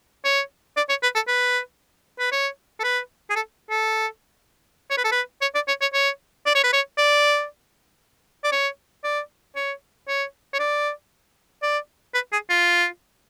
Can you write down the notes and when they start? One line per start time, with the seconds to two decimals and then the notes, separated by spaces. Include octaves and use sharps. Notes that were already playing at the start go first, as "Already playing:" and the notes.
0.25 C#5
0.77 D5
0.90 C#5
1.03 B4
1.15 A4
1.28 B4
2.19 B4
2.32 C#5
2.80 A4
2.84 B4
3.30 G#4
3.36 A4
3.70 A4
4.91 C#5
4.98 B4
5.04 A4
5.12 B4
5.42 C#5
5.55 D5
5.68 C#5
5.81 C#5
5.94 C#5
6.46 D5
6.55 C#5
6.64 B4
6.73 C#5
6.98 D5
8.44 D5
8.52 C#5
9.04 D5
9.56 C#5
10.08 C#5
10.53 C#5
10.59 D5
11.63 D5
12.14 B4
12.32 G#4
12.50 F4